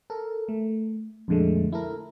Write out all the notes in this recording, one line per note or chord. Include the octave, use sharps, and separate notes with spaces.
A4 A#4
A3
F2 A#2 D3 G#3 A3
E4 A4 A#4